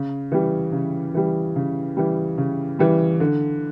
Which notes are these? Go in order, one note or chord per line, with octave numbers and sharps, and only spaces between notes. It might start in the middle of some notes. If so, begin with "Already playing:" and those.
Already playing: C#3
E3 G3
C#3
E3 G3
C#3
E3 G3
C#3
E3 G3
D3